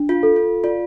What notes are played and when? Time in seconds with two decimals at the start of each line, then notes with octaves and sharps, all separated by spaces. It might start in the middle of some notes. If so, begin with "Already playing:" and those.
Already playing: D4
0.09 F4
0.23 A4
0.36 F4
0.64 F4 D5